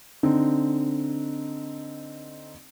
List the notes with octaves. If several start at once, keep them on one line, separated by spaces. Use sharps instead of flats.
D3 C4 D#4